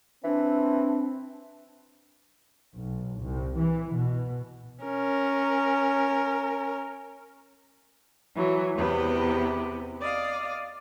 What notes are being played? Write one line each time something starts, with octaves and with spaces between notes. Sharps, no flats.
E3 C4 D4
B1
C2
E3
B2
C#4 A#4
E3 F#3
E2 C3 B3 B4
D5 D#5 F5